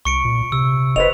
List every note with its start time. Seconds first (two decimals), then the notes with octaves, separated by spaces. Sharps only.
0.05 C2 C#6 C#7 D7
0.25 A#2
0.52 C3 E6
0.96 E1 B4 C5 D#5 F7